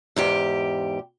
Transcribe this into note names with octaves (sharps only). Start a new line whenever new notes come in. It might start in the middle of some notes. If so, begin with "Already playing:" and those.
E2 G#2 G4